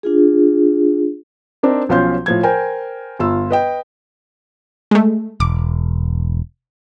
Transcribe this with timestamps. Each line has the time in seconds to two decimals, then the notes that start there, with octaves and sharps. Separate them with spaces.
0.03 D4 F4 G#4
1.63 C4 D4 D#4 A#4
1.89 B1 F3 C#4 F5 C6 G6
2.26 A2 F3 G#6
2.43 A#4 C5 G5 G#5
3.19 G1 F4 E6
3.50 B4 D#5 G5
4.91 G#3 A3
5.40 E1 D6